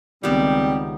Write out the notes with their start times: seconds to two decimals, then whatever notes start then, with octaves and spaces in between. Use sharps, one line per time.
0.23 C#2 D#3 G3 B3 C4 G4